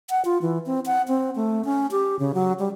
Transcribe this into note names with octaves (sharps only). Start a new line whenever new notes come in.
F#5
F4
E3
C4
F#5
C4
A3
C#4
G4
C#3
F#3
G3